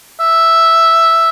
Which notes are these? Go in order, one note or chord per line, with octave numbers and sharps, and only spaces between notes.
E5